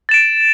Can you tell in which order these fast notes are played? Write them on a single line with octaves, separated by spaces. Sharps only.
A6 E7 D7